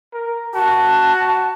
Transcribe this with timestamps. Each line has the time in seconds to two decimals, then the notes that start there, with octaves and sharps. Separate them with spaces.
0.14 A#4
0.54 F#4 A5